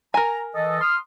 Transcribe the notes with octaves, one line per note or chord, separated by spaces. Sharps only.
A#4 G#5 A#5
E3 A4 D#5
C6 D#6 F6